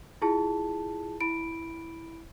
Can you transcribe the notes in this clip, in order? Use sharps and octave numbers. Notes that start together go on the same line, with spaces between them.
E4 F4 G#4 A5
E4 B5 D7